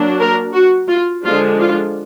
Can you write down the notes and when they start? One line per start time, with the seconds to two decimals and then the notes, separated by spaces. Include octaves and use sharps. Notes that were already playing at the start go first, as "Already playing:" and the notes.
Already playing: F#3 A#3 D4
0.20 A#4
0.54 F#4
0.89 F4
1.24 D3 F3 G#3 D4 F4
1.59 F4